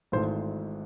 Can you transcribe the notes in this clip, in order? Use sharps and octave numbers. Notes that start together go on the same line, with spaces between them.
G#1 G#2 E3 A3 C5